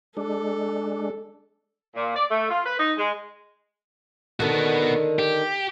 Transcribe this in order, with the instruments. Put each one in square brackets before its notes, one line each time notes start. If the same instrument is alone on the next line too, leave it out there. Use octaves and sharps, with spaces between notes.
[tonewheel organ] G#3 D4 [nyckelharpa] A4
[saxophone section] A#2
D5
A3
F4
B4
D#4
G#3
[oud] D3 D#3 [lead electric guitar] B3 F#4
[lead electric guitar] G4